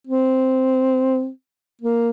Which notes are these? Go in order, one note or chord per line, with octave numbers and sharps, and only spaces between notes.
C4
A#3